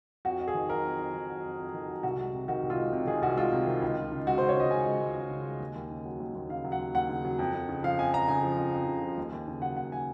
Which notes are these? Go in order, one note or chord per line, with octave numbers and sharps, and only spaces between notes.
F2 F#4
F2
G#4
D#3
F#3 A#4
F2
F2
D#3
F#3
F2
F2
D#3
F#3
C2 F#4
G#3
C3
D#3 F#4
C2
F4
G#3
C3
D#3 G#4
C2 F#4
G#3 F4
C3
D#3
C#2
C#2
C#3
G#3 F#4
C#2 C5
C#5
C#2 D#5
C#3 G#5
G#3
C#2
C#2
C#3
G#3
D#2
D#2
C#3
F#3
D#2
D#2
C#3 F5
F#3
F#5
D#2
D#2 F#5
C#3
F#3
F2
F2
C#3
F3 F5
F2 G#5
F2 A#5
C#3 G#5
F3
F2
F2
C#3
F3
D#2
D#2
C#3
F#3 F#5
D#2 F#5
G#5